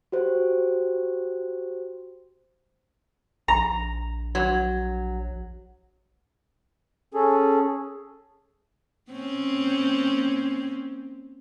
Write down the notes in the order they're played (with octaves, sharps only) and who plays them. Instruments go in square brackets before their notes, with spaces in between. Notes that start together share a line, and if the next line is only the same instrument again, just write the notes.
[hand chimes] F#4 G4 C5
[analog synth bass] A#1 [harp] A#5
[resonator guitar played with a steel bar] F#3
[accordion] C#4 G#4 A4
[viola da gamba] A#3 C4 C#4